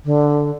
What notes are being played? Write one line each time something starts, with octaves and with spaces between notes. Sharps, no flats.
D3